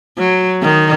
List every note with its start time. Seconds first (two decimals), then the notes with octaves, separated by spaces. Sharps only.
0.18 F#3
0.62 D#3